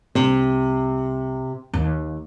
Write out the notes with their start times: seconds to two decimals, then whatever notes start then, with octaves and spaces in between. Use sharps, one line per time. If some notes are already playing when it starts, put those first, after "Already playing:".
0.15 C2 C3
1.74 D#2